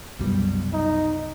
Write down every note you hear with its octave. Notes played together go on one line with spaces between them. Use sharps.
C2 F#2 B2 G3
D#4